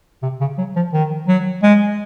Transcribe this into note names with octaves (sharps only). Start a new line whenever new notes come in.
C3
C#3
F#3
F3
D#3
F#3
G#3